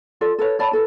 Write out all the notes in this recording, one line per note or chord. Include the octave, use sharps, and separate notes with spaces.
F4 A4 D5
A4 B4 C#5
C#5 D5 A5 B5
E4 A4 B4